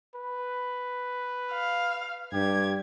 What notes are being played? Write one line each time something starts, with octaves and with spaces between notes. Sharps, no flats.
B4
F5
G2 G4 G#6